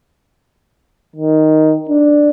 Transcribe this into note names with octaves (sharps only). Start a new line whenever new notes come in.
D#3
D4